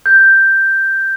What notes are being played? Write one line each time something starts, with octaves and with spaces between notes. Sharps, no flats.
G6